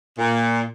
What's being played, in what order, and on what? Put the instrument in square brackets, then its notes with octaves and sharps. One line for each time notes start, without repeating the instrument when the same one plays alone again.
[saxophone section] A#2